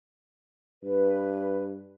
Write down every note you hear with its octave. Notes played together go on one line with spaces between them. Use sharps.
G2 B4